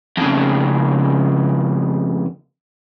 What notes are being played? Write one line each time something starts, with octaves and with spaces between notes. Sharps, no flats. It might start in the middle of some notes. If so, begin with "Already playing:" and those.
F2 C#3